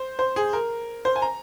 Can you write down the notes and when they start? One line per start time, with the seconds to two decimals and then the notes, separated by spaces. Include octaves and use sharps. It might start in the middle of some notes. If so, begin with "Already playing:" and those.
Already playing: C5
0.19 C5
0.36 G#4
0.53 A#4
1.05 C5
1.16 G#5
1.22 A#5